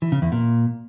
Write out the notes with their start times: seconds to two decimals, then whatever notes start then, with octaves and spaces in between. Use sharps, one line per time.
0.02 E3
0.12 C#3
0.22 E2
0.32 A#2